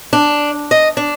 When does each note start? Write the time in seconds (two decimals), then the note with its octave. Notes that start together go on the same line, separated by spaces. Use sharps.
0.13 D4
0.71 D#5
0.97 D4